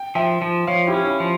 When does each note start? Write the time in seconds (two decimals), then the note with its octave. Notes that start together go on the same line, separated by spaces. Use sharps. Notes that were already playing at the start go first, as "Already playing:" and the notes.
Already playing: G5
0.15 F3 E5 G5
0.42 F3
0.67 F3 C#5 F5
0.87 E4 G4
0.94 C#4
1.06 E4
1.20 F3